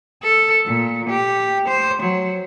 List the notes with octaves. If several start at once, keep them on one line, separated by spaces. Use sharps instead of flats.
A4
A#2
G4
C5
F#3